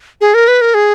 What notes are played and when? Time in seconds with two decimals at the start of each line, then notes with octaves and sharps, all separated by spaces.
0.21 G#4
0.34 A#4
0.48 B4
0.61 A#4
0.74 G#4